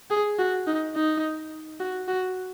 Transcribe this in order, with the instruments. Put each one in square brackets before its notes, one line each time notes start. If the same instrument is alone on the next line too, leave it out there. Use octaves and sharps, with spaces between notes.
[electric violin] G#4
F#4
D#4
D#4
F#4
F#4